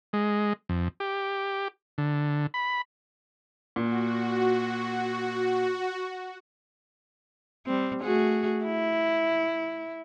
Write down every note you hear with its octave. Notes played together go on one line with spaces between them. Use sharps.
G#3
F2
G4
D3
B5
A#2 F#4
G3 C4
A3 F#4 G#4
E4